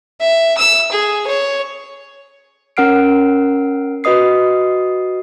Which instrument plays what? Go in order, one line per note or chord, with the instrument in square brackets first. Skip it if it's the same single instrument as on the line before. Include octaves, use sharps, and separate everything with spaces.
[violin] E5
E6
G#4
C#5
[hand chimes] C#4 A#4 F#5 F6 C7 D7
F#4 B4 D#5 D#6 C7